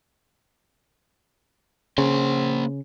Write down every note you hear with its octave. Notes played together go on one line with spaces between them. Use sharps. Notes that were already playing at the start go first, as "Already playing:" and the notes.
C#3 A#3 C5